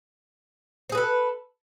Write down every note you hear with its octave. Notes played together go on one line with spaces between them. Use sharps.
G#4 A4 B4 C5